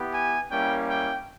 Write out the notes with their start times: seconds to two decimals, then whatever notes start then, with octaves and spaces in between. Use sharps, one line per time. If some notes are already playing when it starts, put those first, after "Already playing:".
Already playing: B3 E4 G4
0.14 G#5
0.50 G3 A#3 C#4 E4 G5
0.88 G5